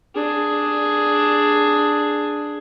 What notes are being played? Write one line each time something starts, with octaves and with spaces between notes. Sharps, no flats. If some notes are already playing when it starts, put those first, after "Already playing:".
D4 G#4